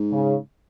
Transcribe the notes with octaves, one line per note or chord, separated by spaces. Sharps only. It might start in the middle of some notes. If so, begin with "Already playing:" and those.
Already playing: G#2
C#3